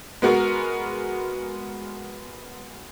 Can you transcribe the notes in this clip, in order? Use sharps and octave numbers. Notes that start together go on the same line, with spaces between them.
G#3 B3 F#4 A#4